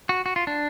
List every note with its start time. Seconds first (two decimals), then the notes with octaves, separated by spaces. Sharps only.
0.09 F#4
0.26 F#4
0.36 F4
0.47 D4